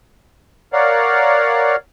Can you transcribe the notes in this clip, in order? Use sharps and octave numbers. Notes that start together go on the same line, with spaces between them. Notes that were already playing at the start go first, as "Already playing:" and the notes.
A#4 C#5 D5 F5 F#5